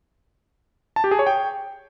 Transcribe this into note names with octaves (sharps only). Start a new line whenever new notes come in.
A5
G4
G#4
C#5
G5